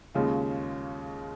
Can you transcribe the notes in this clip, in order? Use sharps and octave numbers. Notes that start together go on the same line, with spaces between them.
D#2 C#3 G#3 C#4 F4